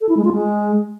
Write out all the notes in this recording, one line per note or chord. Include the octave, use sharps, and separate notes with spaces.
A4
E4
G#3
F4
G#3